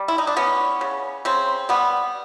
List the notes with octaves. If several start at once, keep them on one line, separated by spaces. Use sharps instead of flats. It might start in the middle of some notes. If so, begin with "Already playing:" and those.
Already playing: G3
E4
D#4
D4
E3 B3 C#4
C#3
C#3 C4
G3 B3